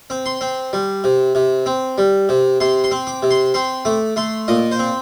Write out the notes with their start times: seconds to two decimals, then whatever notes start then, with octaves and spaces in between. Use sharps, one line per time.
0.10 C4
0.26 C6
0.41 C4
0.73 G3
1.04 C3
1.35 C3
1.66 C4
1.98 G3
2.29 C3
2.60 C3 C6
2.84 C6
2.91 C4
3.07 D6
3.23 C3
3.31 C6
3.54 C4 C6
3.85 A3 D6
4.16 A3 C6
4.48 A#2 D#5
4.71 C5
4.79 C4